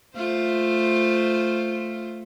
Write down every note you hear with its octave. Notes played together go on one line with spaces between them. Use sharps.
A3 F4 C5